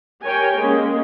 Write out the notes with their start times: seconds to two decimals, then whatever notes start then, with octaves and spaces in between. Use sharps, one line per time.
0.24 G4 A#4 C#5 G5 G#5
0.58 G#3 A#3 C#4